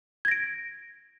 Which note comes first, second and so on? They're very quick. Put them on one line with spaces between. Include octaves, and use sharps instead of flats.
G#6 A#6 D7